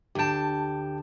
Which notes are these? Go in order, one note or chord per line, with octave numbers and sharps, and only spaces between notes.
D2 G4 G5 A5